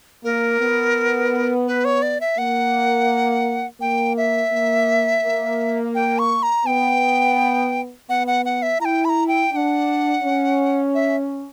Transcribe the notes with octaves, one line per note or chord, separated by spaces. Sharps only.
A#3 A#4
B3
B4
C#5
D5
E5
A#3 F#5
A#3 G5
E5
A#3
A#3
G5
C#6
A#5
B3 G5
B3 F#5
F#5
F#5
E5
E4 G5 A#5
B5
A#5
G5
D4 F#5 G5
C#4
E5